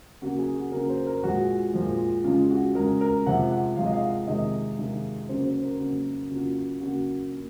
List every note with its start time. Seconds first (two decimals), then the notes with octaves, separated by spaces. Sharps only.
0.22 C#3 F#3 A#3 F#4
0.38 G#4
0.55 F#4
0.72 C#3 F#3 A#3 A#4
0.89 C5
1.06 A#4
1.23 A#2 F3 G#3 F#4
1.74 A#2 F3 G#3
2.24 C#3 G#3 F4
2.51 F#4
2.75 G#3 A#4
2.80 C#3
3.01 A#4
3.26 C3 F3 G#3 F#5
3.51 F#5
3.76 C3 F3 G#3 F5
3.86 D#5
3.93 F5
4.27 C3 D#3 G#3 D#5
4.79 C3 D#3 G#3
5.29 C#3 F#3 A#3 C5
5.46 C5
5.63 A#4
5.80 C#3 F#3 A#3 F#4
6.31 C#3 F#3 A#3 F4
6.81 C#3 F#3 A#3 F#4
7.32 A#3